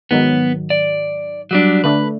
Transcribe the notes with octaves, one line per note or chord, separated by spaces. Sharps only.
G#2 D#3 F#3 B3
D5
F#3 G3 D4
D3 A3 D4 B4